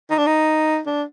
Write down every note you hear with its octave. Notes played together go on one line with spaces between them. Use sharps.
D#4
D4
D#4
D4